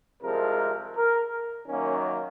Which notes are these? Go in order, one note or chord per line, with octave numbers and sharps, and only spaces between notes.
C2 C3 F3 G#3 A#4
A#4
F#2 D#3 F#3 A#3 C#4